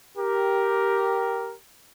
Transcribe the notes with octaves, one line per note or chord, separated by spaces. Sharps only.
G4 A#4